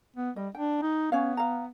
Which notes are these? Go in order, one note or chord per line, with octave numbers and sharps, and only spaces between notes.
B3
G3 D#5
D4 G5
D#4
B3 C#4 C#5 F5
F5 A#5